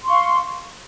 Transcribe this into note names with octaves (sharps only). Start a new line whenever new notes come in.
F5 C6 C#6